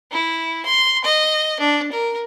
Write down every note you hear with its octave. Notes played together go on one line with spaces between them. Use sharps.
E4
C6
D#5
D4
A#4